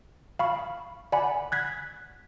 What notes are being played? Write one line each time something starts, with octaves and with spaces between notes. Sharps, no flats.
F5 B5 C#6
D5 F#5 G#5 B5
F#6 G#6 B6